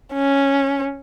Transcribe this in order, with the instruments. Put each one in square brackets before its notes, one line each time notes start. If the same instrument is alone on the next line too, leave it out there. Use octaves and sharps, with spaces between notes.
[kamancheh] C#4